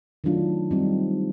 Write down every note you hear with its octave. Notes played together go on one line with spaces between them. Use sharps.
D#3 F#3 A3 D4 F4
G3 C4 D#4